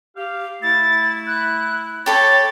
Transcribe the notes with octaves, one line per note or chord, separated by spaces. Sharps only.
G4 F5
A3 E4 A6
F#6
G4 A4 C#5 B5 A6